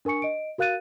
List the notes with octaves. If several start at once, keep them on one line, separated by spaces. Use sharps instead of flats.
D4 A#4 G#5 C#6 C#7
D#5 D7
F#4 A#4 F5 F#6 A6 D#7